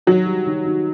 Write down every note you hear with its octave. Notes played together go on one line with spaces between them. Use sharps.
D#3 F#3
G3
D#3
D#3